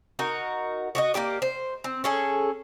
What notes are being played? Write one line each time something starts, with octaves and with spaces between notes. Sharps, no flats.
D#4 F#4 A#4
F#4 G4 D#5
A#3 D#4 G4 D5
C5
C4
C#4 G#4 A4